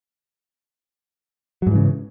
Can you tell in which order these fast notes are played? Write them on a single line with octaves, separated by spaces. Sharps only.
F#3 G#2 E3 C#3